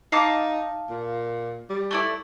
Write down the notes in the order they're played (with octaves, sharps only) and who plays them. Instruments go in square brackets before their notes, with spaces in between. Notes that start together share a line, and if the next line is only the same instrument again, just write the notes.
[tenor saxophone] D#4 [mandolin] F5 A5 D6
[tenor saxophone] A#2
G3
[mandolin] A3 E4 D5